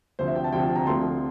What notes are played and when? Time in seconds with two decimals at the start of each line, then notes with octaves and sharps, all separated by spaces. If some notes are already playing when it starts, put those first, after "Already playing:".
0.19 D2 C3 F3 C5
0.28 E5
0.35 G5
0.44 A5
0.52 D2 C3 F3 G5
0.64 A5
0.75 A#5
0.86 D2 C3 F3 A3 C6